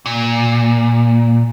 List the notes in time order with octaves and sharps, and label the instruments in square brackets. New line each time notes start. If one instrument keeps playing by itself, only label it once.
[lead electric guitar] A#2